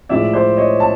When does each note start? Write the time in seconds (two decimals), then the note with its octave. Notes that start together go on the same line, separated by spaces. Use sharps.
0.09 A2 F3 G#3 D5 E5
0.33 C5 D5
0.57 C#5 D#5
0.80 A5